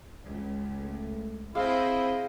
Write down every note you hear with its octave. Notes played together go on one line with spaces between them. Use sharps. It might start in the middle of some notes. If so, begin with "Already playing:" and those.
C#2
A3
C4 E4 G#4 C5 D#5 F5 G5